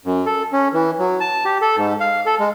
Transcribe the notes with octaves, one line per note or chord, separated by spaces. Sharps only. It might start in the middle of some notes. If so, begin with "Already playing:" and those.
F#2
A4
C#4
E3
F#3
A5
G4
A4
G#2
F5
A4
G#3